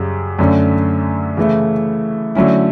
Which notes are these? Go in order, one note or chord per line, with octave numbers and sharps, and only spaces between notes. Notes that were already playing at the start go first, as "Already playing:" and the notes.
Already playing: F#2 C#3 G3
F#2 D3 A3 C#4
C#3 E3 A3 E4
D3 F#3 A3 C#4 E4